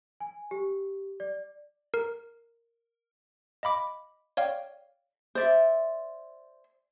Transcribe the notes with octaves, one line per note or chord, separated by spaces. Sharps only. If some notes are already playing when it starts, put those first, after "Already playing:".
G#5
G4
D5
A#4
D#5 F5 B5 D6
C#5 D5 F5 G5
C5 D5 E5